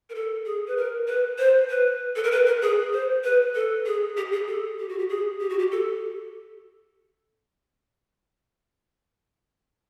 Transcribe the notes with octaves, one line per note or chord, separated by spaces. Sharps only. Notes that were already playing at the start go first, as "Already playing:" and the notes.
A#4
A4
G#4
B4
A#4
B4
C5
B4
A4
A#4
B4
A#4
G#4
C5
B4
A4
G#4
G4
G#4
A4
G4
F#4
G4
G#4
G4
F#4
G4
A4